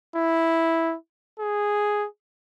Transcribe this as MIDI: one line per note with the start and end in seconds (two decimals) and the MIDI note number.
0.16 0.95 64
1.39 2.06 68